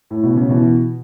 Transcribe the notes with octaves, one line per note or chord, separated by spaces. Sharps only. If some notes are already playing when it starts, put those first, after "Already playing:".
A2
B2
C#3
B2 E3